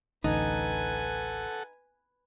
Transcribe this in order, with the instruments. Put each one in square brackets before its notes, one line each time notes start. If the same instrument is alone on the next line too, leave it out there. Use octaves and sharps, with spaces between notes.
[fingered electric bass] A1 D2 [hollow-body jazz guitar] D#4 [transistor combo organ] A4 F#5 [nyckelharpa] B4 G#5